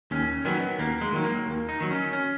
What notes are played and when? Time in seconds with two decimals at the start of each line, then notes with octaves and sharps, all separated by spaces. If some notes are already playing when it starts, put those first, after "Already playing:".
0.11 D#2 C#4
0.45 D#3 F#3 B3
0.79 D#2 A#3
1.01 G#3
1.12 D#3 F#3
1.24 A#3
1.46 D#2
1.69 D#4
1.80 D#3 F#3
1.91 C#4
2.13 C#4